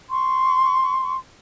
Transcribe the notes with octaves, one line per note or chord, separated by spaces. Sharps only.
C6 C#6